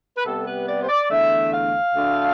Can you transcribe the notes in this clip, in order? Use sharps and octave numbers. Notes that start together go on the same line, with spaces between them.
B4
C3 G3 B3 A4
B4
D5
C5
D5
E2 D3 A3 E5
F5
D2 D3 A3